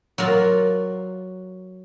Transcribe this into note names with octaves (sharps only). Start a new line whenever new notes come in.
F#3 F4 A#4 D5